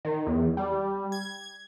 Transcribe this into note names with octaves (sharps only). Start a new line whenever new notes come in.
D#3
E2
G3
G#6